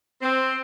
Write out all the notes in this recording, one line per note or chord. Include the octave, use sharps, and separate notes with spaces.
C4